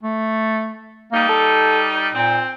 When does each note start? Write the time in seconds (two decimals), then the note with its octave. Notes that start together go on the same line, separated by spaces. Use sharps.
0.03 A3
1.12 G3 A#3 D#4
1.29 A4
2.14 A#2 C4